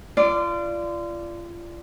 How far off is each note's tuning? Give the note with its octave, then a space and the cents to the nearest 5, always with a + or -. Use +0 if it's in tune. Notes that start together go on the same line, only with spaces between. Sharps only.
F4 -30 D5 +0